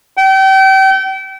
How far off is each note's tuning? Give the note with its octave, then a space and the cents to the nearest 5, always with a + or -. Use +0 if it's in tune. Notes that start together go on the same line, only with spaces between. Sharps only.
G5 -35